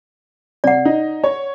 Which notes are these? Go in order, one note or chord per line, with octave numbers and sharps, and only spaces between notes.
C3 D5 F#5
D#4
C#5